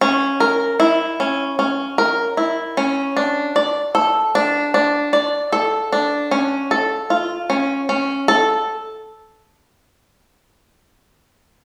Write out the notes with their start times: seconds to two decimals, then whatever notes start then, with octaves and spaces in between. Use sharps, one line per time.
0.01 C#4
0.40 A#4
0.80 E4
1.20 C#4
1.59 C#4
1.98 A#4
2.37 E4
2.77 C#4
3.17 D4
3.56 D5
3.95 A4
4.35 D4
4.74 D4
5.13 D5
5.52 A4
5.92 D4
6.31 C#4
6.71 A4
7.10 F4
7.50 C#4
7.89 C#4
8.28 A4